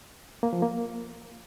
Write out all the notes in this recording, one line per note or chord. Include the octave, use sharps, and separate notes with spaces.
A#3
F3
A#3